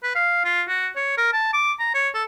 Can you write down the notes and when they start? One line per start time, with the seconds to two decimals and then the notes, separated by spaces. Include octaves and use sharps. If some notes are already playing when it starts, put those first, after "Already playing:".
0.04 B4
0.15 F5
0.45 F4
0.68 F#4
0.96 C#5
1.18 A#4
1.33 A5
1.54 D6
1.79 A#5
1.94 C#5
2.14 A4